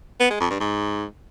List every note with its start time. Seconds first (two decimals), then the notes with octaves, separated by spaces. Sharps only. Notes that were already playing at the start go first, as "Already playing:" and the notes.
0.20 B3
0.30 G#3
0.40 F2
0.50 G2
0.60 G#2